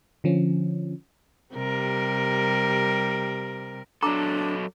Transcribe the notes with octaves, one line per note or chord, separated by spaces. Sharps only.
D3 F3 C#4
C3 G3 A#4
F#3 D4 A4 A#5 D6